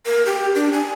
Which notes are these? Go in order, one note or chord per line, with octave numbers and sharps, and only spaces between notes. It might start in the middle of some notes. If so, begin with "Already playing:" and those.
A#4
G4
D4
G#5